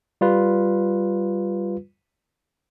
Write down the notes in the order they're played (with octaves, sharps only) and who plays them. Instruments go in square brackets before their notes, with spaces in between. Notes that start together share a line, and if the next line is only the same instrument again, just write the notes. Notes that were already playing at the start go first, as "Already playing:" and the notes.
[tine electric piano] G3 F4 B4